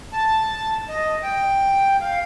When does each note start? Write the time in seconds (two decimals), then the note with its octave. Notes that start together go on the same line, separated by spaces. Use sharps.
0.13 A5
0.89 D#5
1.22 G5
2.01 F5